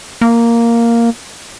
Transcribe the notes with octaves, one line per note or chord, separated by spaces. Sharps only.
A#3